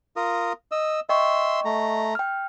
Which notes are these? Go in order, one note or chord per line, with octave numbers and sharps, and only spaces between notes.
F4 A#4 D#6
D#5 E6
D#5 E5 G5 C6 C#6
A3 A#5
G5 F6